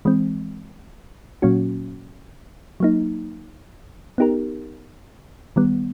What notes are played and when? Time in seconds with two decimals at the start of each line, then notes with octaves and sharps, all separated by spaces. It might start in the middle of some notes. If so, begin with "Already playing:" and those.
0.05 E3 G#3 C4
1.42 A#2 F#3 A#3 C#4 F#4
2.80 F#3 A#3 D#4
4.18 B3 D#4 G4 A#4
5.56 D#3 G3 B3